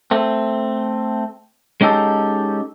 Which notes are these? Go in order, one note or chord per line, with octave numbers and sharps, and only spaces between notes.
A3 C4
G#3 C#4 D#4 G4 A4